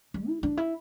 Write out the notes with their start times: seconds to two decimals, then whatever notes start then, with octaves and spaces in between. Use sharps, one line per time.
0.14 G3
0.28 E4
0.43 D4
0.57 E4